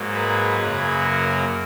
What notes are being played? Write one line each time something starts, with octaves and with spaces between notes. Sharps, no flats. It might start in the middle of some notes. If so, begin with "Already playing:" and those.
Already playing: G#2 F#3 A#3
G#4 B4
F#2 C#3 F#3 A#3 G#4 B4
F#4 A#4